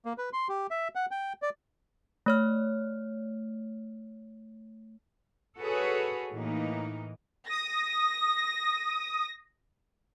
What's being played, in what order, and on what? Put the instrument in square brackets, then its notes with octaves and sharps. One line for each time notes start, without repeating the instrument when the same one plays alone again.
[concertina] A#3
B4
C6
G4
E5
F#5
G5
D5
[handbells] A3 C#5 F6
[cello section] F#4 G#4 A4 B4 C#5
A2 E3 A#3 D#4
[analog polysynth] D#6 [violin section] A#6